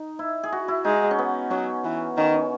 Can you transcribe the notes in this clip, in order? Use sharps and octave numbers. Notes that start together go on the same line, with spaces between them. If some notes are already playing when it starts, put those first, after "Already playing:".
Already playing: D#4
E4
G#4
F#4
E4
G#3 D#4
C#4
B3
F#3 C#4
E3
D#3 C#4
C#4